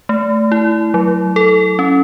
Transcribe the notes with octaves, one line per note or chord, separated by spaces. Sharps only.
A3
E4
F#3
A4
C#4